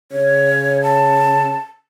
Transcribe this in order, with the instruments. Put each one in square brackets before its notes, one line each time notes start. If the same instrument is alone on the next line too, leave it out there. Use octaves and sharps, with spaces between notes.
[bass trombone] C#3 [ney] C#5
[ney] A5